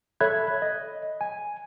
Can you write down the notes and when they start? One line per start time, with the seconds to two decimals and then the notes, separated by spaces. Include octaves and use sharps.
0.20 A4 C#5 E5 B5 F#6 G#6
0.62 D#5
1.21 G#5